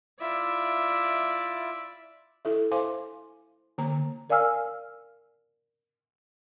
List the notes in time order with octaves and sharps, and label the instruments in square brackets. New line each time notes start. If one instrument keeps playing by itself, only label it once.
[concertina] E4 F4 [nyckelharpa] D5 E5
[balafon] E4 A4 E5
C5 F5 G#5 C6 D6
D3 A#3 A#5
[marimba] A#4 D5 F5 G#5 E6 F6